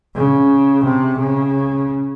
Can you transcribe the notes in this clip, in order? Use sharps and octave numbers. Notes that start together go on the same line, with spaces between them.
C#3
C3
C#3